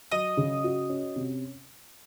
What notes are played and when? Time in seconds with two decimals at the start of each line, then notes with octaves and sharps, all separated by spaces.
0.11 F#3 D#5
0.37 C#3
0.64 F#4
0.90 C#4
1.16 C3